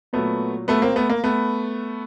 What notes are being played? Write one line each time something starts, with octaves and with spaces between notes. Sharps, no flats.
A#2 F#3 A3 B3
A3 B3
A#3 C4
A3 B3
A#3
A3 B3